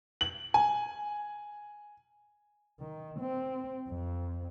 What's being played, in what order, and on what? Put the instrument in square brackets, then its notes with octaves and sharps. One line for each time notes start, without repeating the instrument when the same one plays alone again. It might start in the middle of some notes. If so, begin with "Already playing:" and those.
[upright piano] F#7
G#5
[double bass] D#3
C4
F2